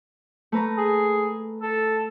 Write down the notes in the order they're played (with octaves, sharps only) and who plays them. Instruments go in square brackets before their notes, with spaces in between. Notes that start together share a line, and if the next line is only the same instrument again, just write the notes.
[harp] A3 B4 A#5
[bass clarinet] G#4
A4